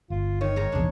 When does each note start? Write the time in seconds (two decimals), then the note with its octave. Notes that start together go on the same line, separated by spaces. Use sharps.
0.10 G1 F4
0.41 D#3 C#5
0.56 G#2 D#3 A#5
0.72 F1 A#1 E2 D4 G#4